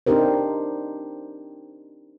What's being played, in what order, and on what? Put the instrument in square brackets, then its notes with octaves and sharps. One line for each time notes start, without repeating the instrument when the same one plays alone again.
[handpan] C4 D4 D#4 G4 A#4 C5